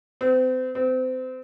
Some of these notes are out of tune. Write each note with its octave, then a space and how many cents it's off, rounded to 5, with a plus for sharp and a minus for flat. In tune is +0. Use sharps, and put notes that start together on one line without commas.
C4 -35
C4 -30